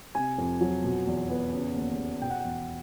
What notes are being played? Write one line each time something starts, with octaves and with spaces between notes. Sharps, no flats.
C3 G#5
F2
F#3
B2
E2
B3
C#3
D#2
D#2
B2 G5
F#5
G5
E2